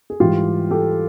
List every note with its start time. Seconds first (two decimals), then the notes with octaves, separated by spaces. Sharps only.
0.10 G#4
0.20 G#2 E3 G3 F4 G4
0.70 G4 A4